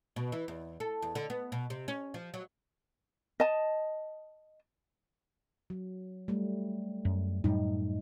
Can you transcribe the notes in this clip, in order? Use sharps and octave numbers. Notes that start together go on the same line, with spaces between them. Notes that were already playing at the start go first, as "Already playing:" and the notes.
B2
E3
E2
A4
E2
D3
B3
B2
C3
C#4
F3
F#3
D#5 A5
F#3
G3 A3
F#2
F#2 A2 G3 D#4